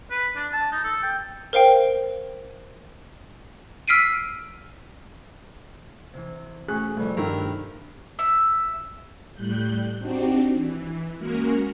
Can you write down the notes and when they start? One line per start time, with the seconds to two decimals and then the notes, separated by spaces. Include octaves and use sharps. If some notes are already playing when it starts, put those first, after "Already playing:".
0.10 B4
0.36 D4
0.53 A5
0.72 D#4
0.84 A4
1.03 G5
1.53 A#4 C5 F5 G5
3.88 E6 F6 B6 C7 D7 D#7
6.14 C3 E3
6.68 A2 C#4 F#4 G#4 F#6
6.97 F2 C3 G3 A3
7.17 G2 D#3 G4 A#4 F#5 E6
8.19 E5
9.34 A2 G3 F#6 G6
9.98 C4 D4 D#4 F#4 G4
10.55 E3
11.18 G#3 A#3 C#4 F#4 A#4